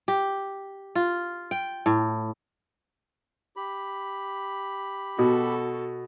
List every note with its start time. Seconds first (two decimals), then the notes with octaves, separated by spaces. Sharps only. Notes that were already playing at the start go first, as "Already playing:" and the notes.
0.08 G4
0.95 F4
1.51 G5
1.86 A2
3.56 G4 B5
5.19 B2 F#4 A4